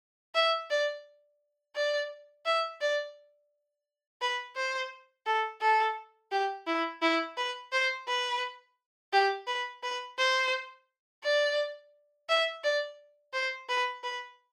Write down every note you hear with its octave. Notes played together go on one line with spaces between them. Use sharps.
E5
D5
D5
E5
D5
B4
C5
A4
A4
G4
E4
E4
B4
C5
B4
G4
B4
B4
C5
D5
E5
D5
C5
B4
B4